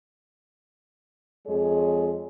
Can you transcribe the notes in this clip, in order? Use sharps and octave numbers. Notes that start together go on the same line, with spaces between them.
F2 G#3 G#4 C#5